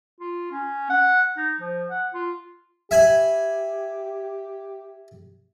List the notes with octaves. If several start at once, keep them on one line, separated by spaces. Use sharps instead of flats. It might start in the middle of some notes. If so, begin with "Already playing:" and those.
F4
C#4
F#5
D#4
F3
F#5
F4
G4 E5 G#5 B5